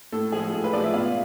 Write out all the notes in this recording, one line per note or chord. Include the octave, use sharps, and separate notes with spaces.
A2 A4
F3 G#3 G#4
A2 A4
B4
F3 G#3 D5
E5
B2 F5